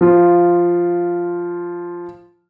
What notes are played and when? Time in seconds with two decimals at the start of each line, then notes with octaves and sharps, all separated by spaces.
0.01 F3 F4